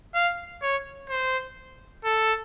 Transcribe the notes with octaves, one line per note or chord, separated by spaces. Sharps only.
F5
C#5
C5
A4